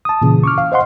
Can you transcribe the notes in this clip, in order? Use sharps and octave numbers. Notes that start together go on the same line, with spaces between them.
A5 D#6
A#2 C#3 E3
C#6 D6 F6
F5
C5 D#5 F5 F#5 C6